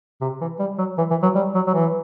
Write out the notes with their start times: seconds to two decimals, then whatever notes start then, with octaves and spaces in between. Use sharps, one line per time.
0.21 C3
0.41 E3
0.60 G3
0.78 F#3
0.98 E3
1.10 E3
1.23 F#3
1.35 G3
1.55 F#3
1.67 F#3
1.74 E3